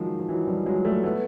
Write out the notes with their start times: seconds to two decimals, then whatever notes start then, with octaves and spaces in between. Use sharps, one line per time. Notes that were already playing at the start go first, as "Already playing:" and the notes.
Already playing: D#3 F3 F#3 G#3
0.20 F3
0.29 E3 F#3
0.47 F3 G3
0.66 F#3 G#3
0.85 G3 A3
1.03 A3 B3